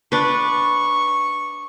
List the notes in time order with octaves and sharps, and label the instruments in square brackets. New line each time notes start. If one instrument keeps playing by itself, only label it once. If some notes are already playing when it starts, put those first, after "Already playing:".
[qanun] D4 B4 [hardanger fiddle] C#6